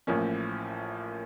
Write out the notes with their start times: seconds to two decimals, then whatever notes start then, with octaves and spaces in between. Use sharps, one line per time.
0.07 A1 A2 F3 A#3 C#4